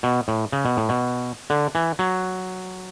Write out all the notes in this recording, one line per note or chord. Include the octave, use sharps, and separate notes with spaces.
B2
A2
C#3
B2
A2
B2
D3
E3
F#3